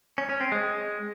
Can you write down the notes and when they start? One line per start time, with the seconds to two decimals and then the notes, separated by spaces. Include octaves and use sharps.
0.18 C#4
0.29 C#4
0.41 C4
0.52 G#3